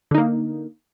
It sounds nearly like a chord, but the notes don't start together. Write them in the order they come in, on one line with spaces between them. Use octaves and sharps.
D3 D#4 A#3